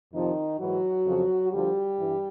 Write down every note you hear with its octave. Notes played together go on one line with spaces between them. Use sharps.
F2 C3 D#3 F3 D#4
G#2 E3 F#3 F#4
F2 C#3 F3
D2 D3 F3 G3 G4
G2 E3